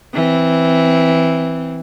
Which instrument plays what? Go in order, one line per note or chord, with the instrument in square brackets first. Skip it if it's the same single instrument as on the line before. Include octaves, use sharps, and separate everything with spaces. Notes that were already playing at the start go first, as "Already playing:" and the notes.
[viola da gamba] E3 C4